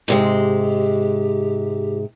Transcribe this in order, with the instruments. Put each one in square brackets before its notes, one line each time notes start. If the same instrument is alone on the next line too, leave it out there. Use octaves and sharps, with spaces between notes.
[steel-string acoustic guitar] G#2 C3 G#3 [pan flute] G4